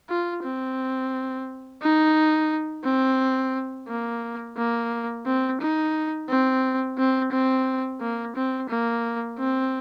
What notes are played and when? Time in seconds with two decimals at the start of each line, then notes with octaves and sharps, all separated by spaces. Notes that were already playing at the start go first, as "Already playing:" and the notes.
0.10 F4
0.44 C4
1.82 D#4
2.84 C4
3.88 A#3
4.57 A#3
5.26 C4
5.61 D#4
6.29 C4
6.98 C4
7.32 C4
8.01 A#3
8.36 C4
8.70 A#3
9.39 C4